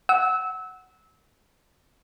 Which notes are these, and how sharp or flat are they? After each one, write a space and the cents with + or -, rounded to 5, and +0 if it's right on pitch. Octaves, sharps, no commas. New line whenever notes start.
F#5 +0 E6 -25